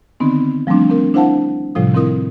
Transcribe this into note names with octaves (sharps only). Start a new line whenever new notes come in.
D3 D#3 B3 C4 D#4
F3 G3 A3 C4 D4
C4 D4 A#4
D4 E4 C5 F5 F#5 A5
A2 C3 F3 G3 F4 D#6
D#3 C4 E4 A#4 D#6